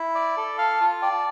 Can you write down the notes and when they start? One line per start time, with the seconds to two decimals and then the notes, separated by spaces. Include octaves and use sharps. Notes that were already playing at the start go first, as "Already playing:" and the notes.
Already playing: E4
0.15 D5
0.37 A4
0.58 F5 A5
0.80 F4
1.02 D5 G5
1.12 A5